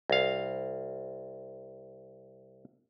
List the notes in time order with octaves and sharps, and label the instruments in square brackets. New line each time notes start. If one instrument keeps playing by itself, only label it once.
[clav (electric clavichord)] C2 F5